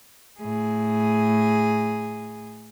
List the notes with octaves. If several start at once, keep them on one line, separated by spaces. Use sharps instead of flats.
A2 G#4